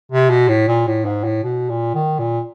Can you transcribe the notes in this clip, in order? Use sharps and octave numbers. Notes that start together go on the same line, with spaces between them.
C3
B2
A2
A#2
A2
G#2
A2
B2
A#2
D#3
A#2